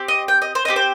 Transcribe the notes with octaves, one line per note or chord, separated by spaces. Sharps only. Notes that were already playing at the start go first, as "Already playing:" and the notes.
Already playing: C4 G4
D#5
G5
D#5
C5
C4 G4 D#5
C5